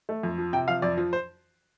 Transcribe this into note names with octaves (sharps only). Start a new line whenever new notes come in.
A3
F2
F3
C3 G5
F3 F5
F2 D5
F3
C5